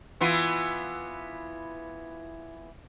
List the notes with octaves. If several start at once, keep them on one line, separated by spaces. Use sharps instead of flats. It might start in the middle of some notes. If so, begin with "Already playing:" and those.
E3 B3 F4